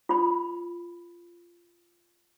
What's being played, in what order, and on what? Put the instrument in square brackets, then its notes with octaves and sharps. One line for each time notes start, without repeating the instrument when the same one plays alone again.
[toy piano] F4 B5